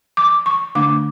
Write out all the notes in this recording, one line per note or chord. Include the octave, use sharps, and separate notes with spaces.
D6
C#6
D3 A3 D4 D6